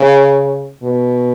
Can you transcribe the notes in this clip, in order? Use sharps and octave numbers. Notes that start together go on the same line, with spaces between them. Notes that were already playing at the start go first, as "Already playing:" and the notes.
Already playing: C#3
B2